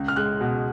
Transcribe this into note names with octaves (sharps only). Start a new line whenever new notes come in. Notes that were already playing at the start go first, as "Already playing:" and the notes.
Already playing: C#2
F6
G#3 F#6
B2